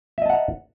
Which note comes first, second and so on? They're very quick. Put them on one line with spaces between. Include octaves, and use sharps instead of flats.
E5 D#5 A5 F#5 A#5